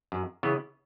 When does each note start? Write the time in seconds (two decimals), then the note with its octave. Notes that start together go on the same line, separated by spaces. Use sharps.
0.12 F#2
0.43 C#3 E3 B3